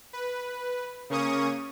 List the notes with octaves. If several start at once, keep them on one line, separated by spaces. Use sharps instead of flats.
B4
C#3 A#3 C#4 C#6 D#6